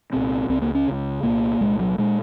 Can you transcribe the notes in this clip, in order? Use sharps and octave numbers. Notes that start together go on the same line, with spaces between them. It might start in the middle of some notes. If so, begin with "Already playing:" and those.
C2 A#2 C4
C#2 C#3 C4
A#3
C#4
C#2 C#3
C2 A#2 A#3
C2 A#2 G#3
F#3
A#2 G#3